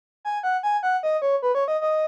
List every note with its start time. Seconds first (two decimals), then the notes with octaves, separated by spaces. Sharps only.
0.25 G#5
0.43 F#5
0.63 G#5
0.83 F#5
1.03 D#5
1.22 C#5
1.42 B4
1.55 C#5
1.68 D#5
1.81 D#5